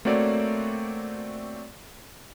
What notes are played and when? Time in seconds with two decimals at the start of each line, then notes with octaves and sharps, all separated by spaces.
0.05 A3 A#3 C4 F#4 C#5 D5